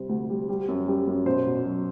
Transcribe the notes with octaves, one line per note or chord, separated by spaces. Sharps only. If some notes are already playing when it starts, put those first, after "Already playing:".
Already playing: C3 G3 C5
D2
G3
G3
F#2
G3
F#2
B2 C5
B2
F#3